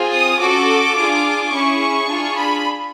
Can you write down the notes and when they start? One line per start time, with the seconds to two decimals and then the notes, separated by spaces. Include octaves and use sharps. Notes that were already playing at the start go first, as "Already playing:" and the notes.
Already playing: C4 F4 G#4
0.11 D#6
0.39 C#4 F#4 A4 D6
0.96 D4 F4 G#4
1.52 C#4 E4 G#4 C#6
2.09 D4 F4 G#4
2.36 B5